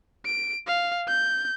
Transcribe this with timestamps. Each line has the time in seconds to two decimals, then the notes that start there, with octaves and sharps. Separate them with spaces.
0.25 D7
0.67 F5
1.08 G6